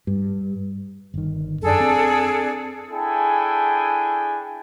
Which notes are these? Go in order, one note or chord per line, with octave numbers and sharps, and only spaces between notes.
G2
G1 D#3
F#2 D4 G#4 A4
C4
D4 E4 G#4 A4 G5 G#5